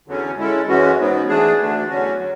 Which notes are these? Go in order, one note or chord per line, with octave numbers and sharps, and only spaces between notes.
E2 D3 F#3 C#4
G#3 C#4 E4 A4
F#2 E3 G#3 C#4 F#4
G#2 F#3 B3
E3 A3 D4 G#4
D2 D3 A3 D4
E2 D3 F#3 C#4 F#4
F#3